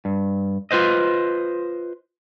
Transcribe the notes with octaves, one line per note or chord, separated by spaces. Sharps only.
G2
F4 B4 C5 D#5